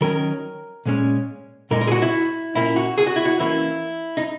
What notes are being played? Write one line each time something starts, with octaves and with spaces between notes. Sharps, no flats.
D#3 F#3 C#4 A#4
A#2 G#3 C#4
A#2 G#3 D#4 A#4
A#4
G#4
F#4
E4
A#2 A#3 C#4 E4
F#4
G#4
F#4
E4
F#4
E3 A#3 C#4 E4
D#4